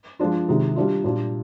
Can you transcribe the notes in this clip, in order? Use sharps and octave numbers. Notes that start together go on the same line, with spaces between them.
F3 G#3 D4 F4
C3 D#3 G#3
G3 D4 F4
A#2 G3 D4 F4